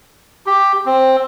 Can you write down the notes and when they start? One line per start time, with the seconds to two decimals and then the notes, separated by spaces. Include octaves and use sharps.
0.46 G4
0.86 C4